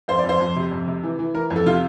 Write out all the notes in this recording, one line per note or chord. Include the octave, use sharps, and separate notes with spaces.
F2 C5
D5
F2 C5
F2
C3
F2
C3
E3
E3
E3 A#4
F2
A4
C3 F4